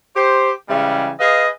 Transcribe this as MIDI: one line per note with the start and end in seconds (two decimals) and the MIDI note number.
0.16 0.52 67
0.16 0.52 72
0.69 1.11 49
0.69 1.11 52
0.69 1.11 55
0.69 1.11 56
1.20 1.48 68
1.20 1.48 71
1.20 1.48 75
1.20 1.48 77